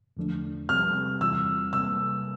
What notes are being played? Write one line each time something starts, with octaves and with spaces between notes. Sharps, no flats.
E2 D3 F3 A3 D4
C2 C3 G3 C4 G4 F6
E2 E3 G3 C4 F4 E6
C3 G3 A#3 E6